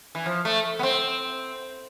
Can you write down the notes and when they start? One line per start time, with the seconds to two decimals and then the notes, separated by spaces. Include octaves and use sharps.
0.15 E3
0.26 F3
0.45 A3
0.79 B3
0.83 C4